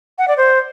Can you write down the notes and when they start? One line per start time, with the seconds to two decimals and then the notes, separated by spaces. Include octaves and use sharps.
0.18 F#5
0.28 D5
0.37 C5